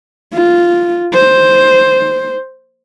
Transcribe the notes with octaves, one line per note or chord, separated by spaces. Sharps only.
F4
C5